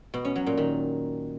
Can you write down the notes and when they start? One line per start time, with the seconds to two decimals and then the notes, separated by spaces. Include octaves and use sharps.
0.14 B2
0.25 C#4
0.36 F#3
0.47 A#2
0.58 D#3